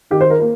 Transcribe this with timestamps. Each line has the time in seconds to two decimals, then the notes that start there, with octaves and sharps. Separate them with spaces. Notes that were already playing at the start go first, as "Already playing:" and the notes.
0.11 D#3 G4
0.21 C5
0.30 A#4
0.40 A#3